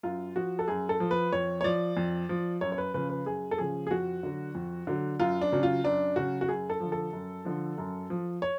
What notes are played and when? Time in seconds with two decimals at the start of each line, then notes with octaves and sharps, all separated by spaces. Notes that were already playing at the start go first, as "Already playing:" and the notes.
0.03 F#2 F4
0.36 F3 F#4
0.59 A4
0.68 F#2 G#4
0.89 A4
1.00 F3
1.11 B4
1.32 F2 C#5
1.61 C#5
1.64 F3 D5
1.97 F2
2.29 F3
2.61 F#2 C#5
2.72 C#5
2.78 B4
2.94 C#3 F3 B4
3.10 B4
3.26 F#2 G#4
3.51 A4
3.58 C#3 F3 G#4
3.87 G#4
3.91 F2 F#4
4.23 D3 F#3
4.55 F2
4.87 D3 F#3
5.20 F#2 F4
5.41 D4
5.52 C#3 F#3
5.63 F4
5.84 F#2 D4
6.16 C#3 F#3 F#4
6.41 F#4
6.49 F#2 G#4
6.70 A4
6.80 D3 F3
6.92 A4
7.13 F#2
7.45 D3 F3
7.78 F#2
8.10 F3
8.42 C#5